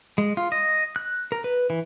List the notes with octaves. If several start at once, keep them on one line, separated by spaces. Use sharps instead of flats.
G#3
F4
D#5
F#6
A#4
B4
E3